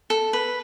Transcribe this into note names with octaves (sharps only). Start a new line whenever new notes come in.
A4
B4